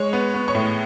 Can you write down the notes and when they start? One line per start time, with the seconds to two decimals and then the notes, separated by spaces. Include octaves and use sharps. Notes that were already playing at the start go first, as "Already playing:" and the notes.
Already playing: G#3 C#5 C#6
0.13 B3
0.34 B3
0.48 C#5 C#6
0.55 A2